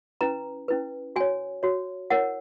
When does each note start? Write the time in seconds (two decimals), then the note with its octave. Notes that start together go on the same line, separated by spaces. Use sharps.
0.21 C#4 E4 B4 A#5
0.68 C#4 E4 B4
1.16 F#4 C#5 G#5
1.63 F#4 C#5
2.10 E4 A#4 C#5 F#5